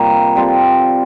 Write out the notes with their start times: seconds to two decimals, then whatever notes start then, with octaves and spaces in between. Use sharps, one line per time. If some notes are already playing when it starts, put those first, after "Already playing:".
Already playing: C3 G3 A#3 F4
0.35 G3 C4 F4 A4